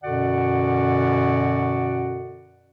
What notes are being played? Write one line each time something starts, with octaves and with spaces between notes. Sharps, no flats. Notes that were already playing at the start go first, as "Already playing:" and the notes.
F#2 B2 D3 F#4 D5 F#5